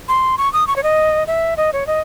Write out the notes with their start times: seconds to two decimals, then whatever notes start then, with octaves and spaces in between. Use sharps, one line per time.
0.08 C6
0.38 C#6
0.53 D#6
0.67 C#6
0.76 C#5
0.83 D#5
1.27 E5
1.57 D#5
1.73 C#5
1.87 D#5